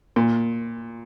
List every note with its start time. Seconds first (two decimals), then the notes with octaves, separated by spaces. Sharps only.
0.16 A#2